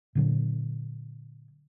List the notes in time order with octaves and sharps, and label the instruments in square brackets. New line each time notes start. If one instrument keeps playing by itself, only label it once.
[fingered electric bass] A#2 D3 F#3